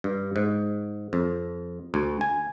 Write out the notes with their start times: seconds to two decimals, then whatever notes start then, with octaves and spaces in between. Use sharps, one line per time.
0.04 G2
0.36 G#2
1.13 F2
1.94 D2
2.21 G#5